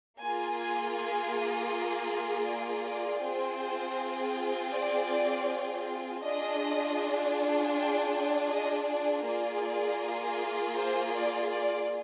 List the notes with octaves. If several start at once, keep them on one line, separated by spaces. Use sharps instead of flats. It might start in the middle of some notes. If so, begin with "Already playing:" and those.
A#3 F4 G#4 G#5
G#5
G#5
D5
D5
C4 F4 G#4 C5
D5
D4 F4 G#4 D#5
G5
D#5
D5
A#3 F4 G#4 D5
C5
D5
D5